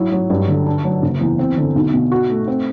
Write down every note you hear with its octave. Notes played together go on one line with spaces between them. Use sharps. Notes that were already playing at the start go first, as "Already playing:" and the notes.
Already playing: F#3 E4
F#3
G2
D3
D4
F#3
F#1
E2
C4
D3
B1
B2
F#4
A3
C4